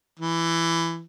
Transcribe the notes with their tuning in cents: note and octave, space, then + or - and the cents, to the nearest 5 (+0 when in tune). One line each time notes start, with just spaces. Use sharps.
E3 +15